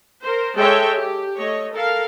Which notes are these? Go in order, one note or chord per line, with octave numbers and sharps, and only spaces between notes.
A#4 C5
G#3 G#4 A4 C#5 E5 G5
G4
A3 C#5 D#5
A4 A#4 F5